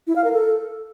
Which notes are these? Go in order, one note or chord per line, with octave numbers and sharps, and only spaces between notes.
E4
F5
A#4
A4